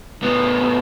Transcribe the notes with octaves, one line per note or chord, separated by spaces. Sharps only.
A2 B3